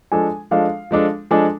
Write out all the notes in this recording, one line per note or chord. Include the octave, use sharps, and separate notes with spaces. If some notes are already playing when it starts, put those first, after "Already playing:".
F3 G#3 D4 A4 G#5
F3 G#3 D4 A4 F5
F3 G#3 D4 A4
F3 G#3 D4 A4 G#5